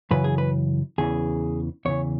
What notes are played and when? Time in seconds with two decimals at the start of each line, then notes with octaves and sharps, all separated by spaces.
0.11 F#2 C#3 E3 B4
0.24 G#4
0.38 B4
0.98 E2 C#3 E3 G#4
1.85 E2 C#3 E3 C#5